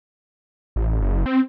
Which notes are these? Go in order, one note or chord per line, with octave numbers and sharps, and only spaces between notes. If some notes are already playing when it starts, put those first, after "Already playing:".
A1
F#1
C4